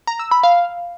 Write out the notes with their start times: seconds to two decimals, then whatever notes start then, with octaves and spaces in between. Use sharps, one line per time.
0.07 A#5
0.19 E6
0.31 B5
0.43 F5